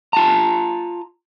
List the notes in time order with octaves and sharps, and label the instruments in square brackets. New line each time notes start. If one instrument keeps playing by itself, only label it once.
[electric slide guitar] F4 A5 A#5